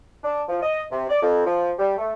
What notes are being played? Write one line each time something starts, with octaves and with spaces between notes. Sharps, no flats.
D4
F3
D#5
C3
D5
F2
F3
G3
A3